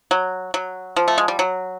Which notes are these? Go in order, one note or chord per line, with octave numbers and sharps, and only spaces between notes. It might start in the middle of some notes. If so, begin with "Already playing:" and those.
F#3
F#3
F3
A3
G#3
G3
F#3